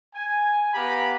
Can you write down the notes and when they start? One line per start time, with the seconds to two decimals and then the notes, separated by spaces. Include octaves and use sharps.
0.15 G#5
0.74 B3 G4 F5 A#5 B5